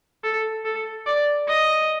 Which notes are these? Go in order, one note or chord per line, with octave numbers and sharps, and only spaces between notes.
A4
A4
D5
D#5